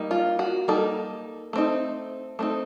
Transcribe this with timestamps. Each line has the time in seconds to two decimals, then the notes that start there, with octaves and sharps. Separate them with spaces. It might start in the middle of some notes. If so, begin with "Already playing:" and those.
Already playing: G3 A#3 D#4
0.11 F4
0.39 F#4
0.68 G3 A#3 D#4 A4
1.53 A3 C4 D#4
2.39 A3 C4 D#4